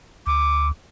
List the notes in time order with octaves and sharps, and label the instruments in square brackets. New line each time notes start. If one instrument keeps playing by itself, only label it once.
[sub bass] D2 [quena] D6